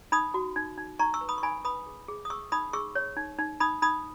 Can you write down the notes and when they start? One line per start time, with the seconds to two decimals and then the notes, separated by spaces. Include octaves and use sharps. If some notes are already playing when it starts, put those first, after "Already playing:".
0.12 D#4 B5 D#6
0.34 F#4
0.56 D#4
0.78 D#4
0.99 D#4 A#5 C#6
1.14 C#6 E6
1.21 B4
1.29 B5 D#6
1.38 C#6
1.43 D#4 G#5 B5
1.65 B4 B5 D#6
1.86 G#4
2.08 G#4
2.25 D#6
2.30 G#4 C#6 E6
2.52 D#4 B5 D#6
2.73 G#4 C#6 E6
2.95 C#5
3.17 D#4
3.39 D#4
3.60 D#4 B5 D#6
3.82 D#4 B5 D#6